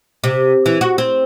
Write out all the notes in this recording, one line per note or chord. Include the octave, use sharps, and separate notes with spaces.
C3
E3
F#4
C4